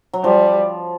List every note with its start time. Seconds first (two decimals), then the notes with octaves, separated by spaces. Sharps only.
0.13 F#3
0.24 F3 G3